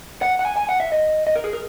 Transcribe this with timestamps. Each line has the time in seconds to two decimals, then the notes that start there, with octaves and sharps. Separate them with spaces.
0.22 F#5
0.39 F#5
0.45 G#5
0.57 G#5
0.69 F#5
0.80 E5
0.92 D#5
1.27 D#5
1.36 A#4
1.44 G#4
1.53 A#4